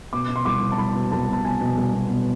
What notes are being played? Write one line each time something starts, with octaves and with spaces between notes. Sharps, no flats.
B2 D6
B2
C6
C2 D6
B2
A5
C2 B5
B2
C2 A5
B2 A5
B2 G#5
B2
C2
B2
B2